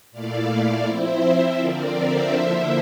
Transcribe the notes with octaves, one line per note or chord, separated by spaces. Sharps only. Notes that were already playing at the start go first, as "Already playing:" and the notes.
A#2 A3 E4 D5 F5
D5 F5
F3 C4 E4 C5 E5
D3 F3 C4 A#4 D5
C5 E5
D3 F3 A#3 E4